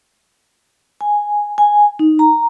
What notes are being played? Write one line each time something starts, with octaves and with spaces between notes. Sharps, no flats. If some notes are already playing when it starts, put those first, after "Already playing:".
G#5
G#5
D#4
A#5